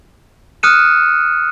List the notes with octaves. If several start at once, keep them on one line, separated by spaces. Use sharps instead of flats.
D#6 F6 F#6 C#7 D#7 E7